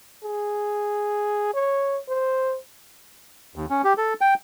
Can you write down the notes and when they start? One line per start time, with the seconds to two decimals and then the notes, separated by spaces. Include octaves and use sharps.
0.24 G#4
1.54 C#5
2.09 C5
3.56 D#2
3.70 C#4
3.84 G4
3.98 A4
4.21 G5